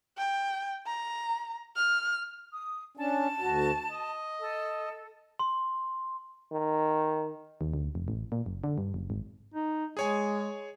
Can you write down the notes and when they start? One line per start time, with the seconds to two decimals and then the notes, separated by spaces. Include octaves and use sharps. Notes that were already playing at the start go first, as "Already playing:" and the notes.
0.18 G5
0.86 A#5
1.76 F6
2.52 D#6
2.97 C#4 D4 A5
3.40 D2 F#4
3.90 D#5
4.40 A4
5.39 C6
6.52 D#3
7.61 D#2
7.74 D2
7.95 F1
8.08 A1
8.32 A#2
8.46 F#1
8.64 D3
8.78 G2
8.94 F#1
9.10 G#1
9.54 D#4
9.97 G#3 G#4 C#5 G#5